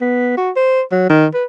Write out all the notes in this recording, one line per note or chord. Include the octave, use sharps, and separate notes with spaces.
B3
F#4
C5
F#3
D#3
B4